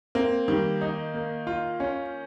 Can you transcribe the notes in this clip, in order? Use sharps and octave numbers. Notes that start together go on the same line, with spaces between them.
A#3 C4
D#3 G3
D#4
A#3
F4
C#4